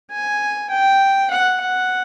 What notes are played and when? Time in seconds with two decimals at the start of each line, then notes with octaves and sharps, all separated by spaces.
0.11 G#5
0.70 G5
1.30 F#5
1.60 F#5